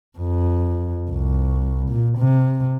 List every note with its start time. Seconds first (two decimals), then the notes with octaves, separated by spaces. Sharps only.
0.18 F2
1.10 C2
1.89 A#2
2.18 C3